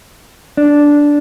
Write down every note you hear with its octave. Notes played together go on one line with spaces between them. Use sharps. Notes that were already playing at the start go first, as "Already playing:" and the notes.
D4